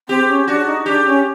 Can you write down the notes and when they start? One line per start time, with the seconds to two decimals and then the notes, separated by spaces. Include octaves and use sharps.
0.09 C4 G4
0.28 C#4
0.48 D4 F#4
0.66 D#4
0.86 D4 G4
1.06 C#4